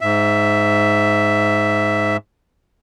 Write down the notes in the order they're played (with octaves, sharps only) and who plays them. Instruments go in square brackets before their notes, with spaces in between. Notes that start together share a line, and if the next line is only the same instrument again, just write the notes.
[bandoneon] G#2 E5